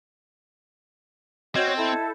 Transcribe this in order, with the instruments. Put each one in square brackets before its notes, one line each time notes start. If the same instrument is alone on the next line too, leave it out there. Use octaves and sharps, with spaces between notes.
[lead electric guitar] C4 [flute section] F#4 C#5 [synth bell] D#5 G6 G#6
[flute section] E4 A4